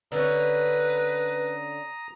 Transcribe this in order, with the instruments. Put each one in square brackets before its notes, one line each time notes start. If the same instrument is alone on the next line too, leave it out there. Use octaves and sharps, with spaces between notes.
[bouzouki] D3 C#4 [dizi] B4 [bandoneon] A#5 D#6